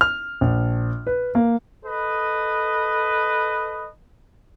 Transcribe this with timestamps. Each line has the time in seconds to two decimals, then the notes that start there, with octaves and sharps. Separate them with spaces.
0.01 F6
0.41 A#1
1.07 B4
1.35 A#3
1.84 A4 B4 D#5